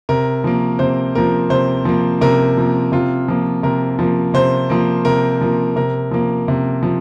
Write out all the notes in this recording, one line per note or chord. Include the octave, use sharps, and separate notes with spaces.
C3 A#4
F3 A#3
C3 C5
F3 A#3 A#4
C3 C5
F3 A#3
C3 A#4
F3 A#3
C3 F4
F3 A#3
C3 A#4
F3 A#3
C3 C5
F3 A#3
C3 A#4
F3 A#3
C3 A#4
F3 A#3
C3
F3